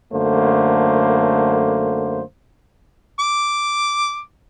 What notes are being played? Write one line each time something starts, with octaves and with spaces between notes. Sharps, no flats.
F#2 D3 A3 A#3 C5
D6